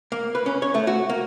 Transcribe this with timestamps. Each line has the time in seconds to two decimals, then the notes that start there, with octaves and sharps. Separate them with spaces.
0.12 A#3
0.35 B4
0.46 C#4
0.62 C#5
0.75 A3
0.87 F#4
1.09 A#3